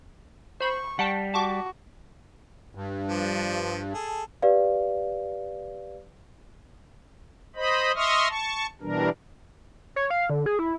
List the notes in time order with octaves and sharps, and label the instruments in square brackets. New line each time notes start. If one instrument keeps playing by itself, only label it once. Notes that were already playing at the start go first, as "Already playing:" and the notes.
[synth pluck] C5 B5 [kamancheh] C#6
[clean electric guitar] G3 [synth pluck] F#5 G5 A5
[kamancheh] F#4 [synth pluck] A5 C#6 D6
[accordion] G2
[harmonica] F3 D4
G#4 A4
[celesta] G4 B4 D5 F5
[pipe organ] C5 D#5 B5
D#5 E5 C6 C#6 D#6 F6
A5 C#6
B2 E3 G3 D4 A#4
[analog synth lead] C#5
F5
D3
G#4
E4